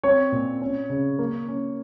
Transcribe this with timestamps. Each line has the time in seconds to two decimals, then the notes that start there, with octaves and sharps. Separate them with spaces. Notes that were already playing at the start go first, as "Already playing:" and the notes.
0.03 C4 C#5
0.32 A#2
0.61 C#4
0.90 C#3
1.19 A#3
1.48 C#4